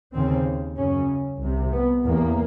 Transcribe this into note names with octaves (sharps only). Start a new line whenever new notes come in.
D#2 C#3 C4
F#2 C#3 C#4
C2 C3
B3
E2 C3 A#3